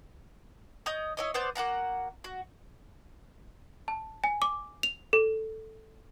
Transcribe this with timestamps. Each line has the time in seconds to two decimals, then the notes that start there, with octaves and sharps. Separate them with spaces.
0.86 C#5 D#5 D#6 G6
1.17 E4 C#5 D#5
1.34 B3 C5 D5 G6
1.55 A#3 F#4 F#5 A#5
2.24 F#4
3.88 A5
4.24 G#5
4.42 D6
4.83 F7
5.13 A4